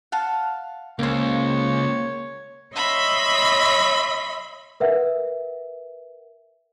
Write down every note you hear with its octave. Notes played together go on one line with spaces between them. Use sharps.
F5 F#5 A5
C#2 A#3 C5 C#5 D6
C#5 D#5 E5 B5 C6
A#4 B4 E5 F#5